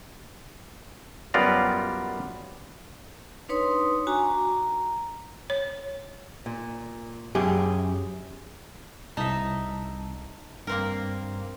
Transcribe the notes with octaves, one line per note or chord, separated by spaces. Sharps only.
F#2 G3 B3 F4 D5 A#5
D4 D#4 B4 C#5 C6 D#6
D4 F#4 G#5 A#5 C#6 D6
A#5
C#5
A#2
F#2 G4 G#4
C2 D#4 E5 A5
G2 A#3 C4 A#4